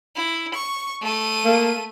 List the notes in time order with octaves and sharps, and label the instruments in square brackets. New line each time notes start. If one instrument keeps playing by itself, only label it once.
[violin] E4
C#6
A3 D#7
[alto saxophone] A#3